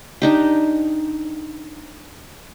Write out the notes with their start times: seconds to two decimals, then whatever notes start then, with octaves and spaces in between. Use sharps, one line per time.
0.22 D4 D#4 G4